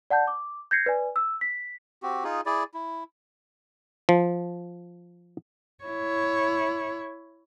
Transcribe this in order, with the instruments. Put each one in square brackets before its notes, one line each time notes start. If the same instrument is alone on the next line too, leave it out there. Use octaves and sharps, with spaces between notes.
[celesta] D5 F#5 A5 G6
D6
G6 G#6 A#6 C7 C#7
B4 D5 G#5
E6
B6
[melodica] C4 F#4 G4
D#4 F4 G#4
E4 G#4 D5
E4
[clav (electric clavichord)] F3
[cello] E4 C#5